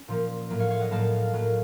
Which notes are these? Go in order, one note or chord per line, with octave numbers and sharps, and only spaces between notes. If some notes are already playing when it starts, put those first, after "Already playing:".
Already playing: C#4
A#2 F3 A#3
A2 F#3 A#3
C#5 F5
C#5 F5
D#5 F#5
A2 F#3 A#3 F5 A5
A2 F#3 A#3